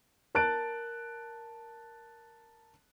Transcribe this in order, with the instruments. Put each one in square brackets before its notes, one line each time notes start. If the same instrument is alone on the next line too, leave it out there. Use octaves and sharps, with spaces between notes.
[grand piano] A#4 A5 F#6 A6 D7